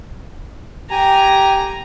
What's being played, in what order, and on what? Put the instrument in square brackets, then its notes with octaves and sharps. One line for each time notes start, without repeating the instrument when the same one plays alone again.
[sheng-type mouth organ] G4 G#5 [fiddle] A#5